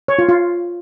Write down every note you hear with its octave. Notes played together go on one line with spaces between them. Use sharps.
C#5
F4
F4